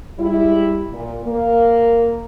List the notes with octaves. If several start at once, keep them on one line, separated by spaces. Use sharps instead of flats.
G3 G#3 E4
A#2
A#3